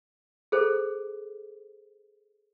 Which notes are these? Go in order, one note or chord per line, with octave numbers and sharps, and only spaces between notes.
G#4 A4 C5